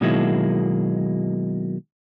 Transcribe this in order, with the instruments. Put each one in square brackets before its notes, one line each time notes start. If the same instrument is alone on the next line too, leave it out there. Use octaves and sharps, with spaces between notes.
[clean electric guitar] B2 D#3 F#3 G#3 A#3 E4